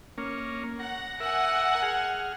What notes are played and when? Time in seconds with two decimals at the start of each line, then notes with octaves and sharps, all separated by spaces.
0.18 A#3 C#4
0.80 F#5 A#5
1.20 A#4 E5 F#5 G#5
1.82 G#4 F6